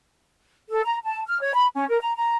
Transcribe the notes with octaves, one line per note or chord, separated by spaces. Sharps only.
A4
A#5
A5
F6
C#5
B5
C#4
A#4
A#5
A#5